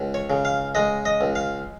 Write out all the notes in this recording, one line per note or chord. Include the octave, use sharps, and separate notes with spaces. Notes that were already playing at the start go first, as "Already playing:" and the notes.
Already playing: C#2
C#5
C#3
F5
G#3 D#5
D#5
C#2
F5